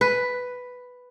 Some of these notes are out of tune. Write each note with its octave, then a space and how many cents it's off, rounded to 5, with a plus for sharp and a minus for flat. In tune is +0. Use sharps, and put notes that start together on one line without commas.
B4 +5